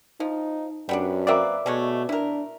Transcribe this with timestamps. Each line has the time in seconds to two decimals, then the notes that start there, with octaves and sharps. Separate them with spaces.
0.20 F3 D#4
0.89 F#2 G3 B3 D4
1.27 A#3 C4 B4 D5 E5 D6
1.66 B2 G#3 A3 C#5
2.09 D4 E4 A#4